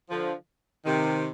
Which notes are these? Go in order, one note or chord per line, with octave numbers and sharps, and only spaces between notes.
D3 F3
C3 D#3